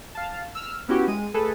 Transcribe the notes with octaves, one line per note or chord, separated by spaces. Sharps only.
F5 A5
E6 F6
B3 C#4 E4 F#4 G4
G#3 D#7
A3 G#4 A4 B4